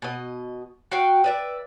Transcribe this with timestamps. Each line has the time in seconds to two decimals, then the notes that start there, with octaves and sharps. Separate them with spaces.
0.02 B2 D#5
0.91 F#4 F5 G5
1.24 B4 D5 E5